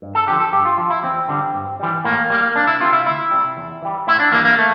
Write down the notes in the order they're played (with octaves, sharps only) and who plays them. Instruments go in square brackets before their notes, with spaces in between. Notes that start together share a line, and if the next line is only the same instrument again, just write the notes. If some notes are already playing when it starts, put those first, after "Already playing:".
[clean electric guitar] G2
A4
D3 F3 G4
A4
G2 G4
F4
F3 F4
E4
E2 C4
D3 G3
G2
E3 G3
A2 A#3
G3 A#3
C2 D4
E4
C3 F4
G3
E4
D2 E4
C3 G3
E2
E3 G3
A2 E4
D4
E3 G3 A#3
A#3
A3